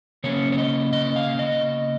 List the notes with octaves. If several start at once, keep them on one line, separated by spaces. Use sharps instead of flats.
C#3 A#3 C#4 C#5
C#5
D#5
D#5
F5
D#5